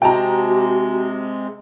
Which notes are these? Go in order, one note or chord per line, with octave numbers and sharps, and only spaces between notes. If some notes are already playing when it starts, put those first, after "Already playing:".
C3 G#3 F#4 G5 A5 A#5